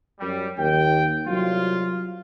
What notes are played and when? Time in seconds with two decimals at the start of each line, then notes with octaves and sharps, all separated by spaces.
0.20 F#2 G3
0.58 D#2 G5
1.26 C2 F#3 F4